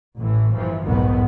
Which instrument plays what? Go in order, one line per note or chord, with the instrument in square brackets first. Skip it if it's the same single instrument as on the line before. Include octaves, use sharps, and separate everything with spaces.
[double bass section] A1 A2 E3
G1 E3 F3
F1 B1 E2 G#2 D#3 B3